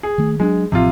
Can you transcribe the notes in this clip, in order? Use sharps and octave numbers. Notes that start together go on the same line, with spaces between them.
G#4
D#3 A3
F#3 G#3 C#4 D4
A1 A2 C3 F3 F4